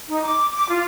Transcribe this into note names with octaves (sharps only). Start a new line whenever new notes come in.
D#4
D6
D6
F4